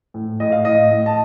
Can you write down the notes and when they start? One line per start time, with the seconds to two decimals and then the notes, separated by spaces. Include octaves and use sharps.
0.14 A2
0.40 A2 D#5
0.52 F5
0.65 A2 D#5
0.91 A2
1.06 A5